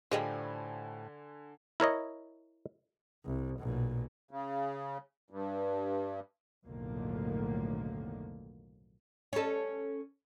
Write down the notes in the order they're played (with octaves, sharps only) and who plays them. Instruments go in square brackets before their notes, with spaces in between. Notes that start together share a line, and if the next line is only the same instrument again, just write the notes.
[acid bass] A2 [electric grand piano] D3 G#5 [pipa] F3 G3 [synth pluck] G4 G#4 D#5
[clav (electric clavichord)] E4 A#4 C#5 D#5
[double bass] C2
B1 A#2
[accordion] C#3
G2
[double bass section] B1 F2 A2 D3 D#3 A#3
[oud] C#4 A4